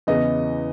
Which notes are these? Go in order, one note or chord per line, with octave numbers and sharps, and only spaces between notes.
E2 C#3 E3 B3 D#5